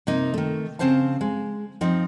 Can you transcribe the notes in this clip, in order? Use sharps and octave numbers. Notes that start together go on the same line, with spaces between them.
C3 A#3 D#4
D#3 A3
C#3 F#3 C4 C5 F5 A5
G#3
F3 C4 D#4